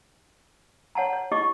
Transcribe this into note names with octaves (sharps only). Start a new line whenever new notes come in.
C#5 F#5 A5 A#5
C#5
E4 G4 D#5 C#6 D6